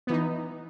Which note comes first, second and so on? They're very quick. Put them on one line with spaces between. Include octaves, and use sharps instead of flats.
B3 E3 D#4